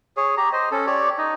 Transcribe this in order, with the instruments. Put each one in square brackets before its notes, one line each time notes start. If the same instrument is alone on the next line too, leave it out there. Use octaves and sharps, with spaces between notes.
[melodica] G#4 C#5
G4 A#5
C5 D#5
C#4 A4
G4 C#5 D5
D#4 D#5